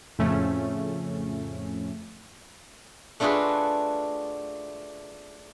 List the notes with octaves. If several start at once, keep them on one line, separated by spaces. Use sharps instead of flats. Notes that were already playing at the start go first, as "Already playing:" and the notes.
F2 A2 C#3 F3 A3 C#4
A3 D4 F4 F#4 G#4 B4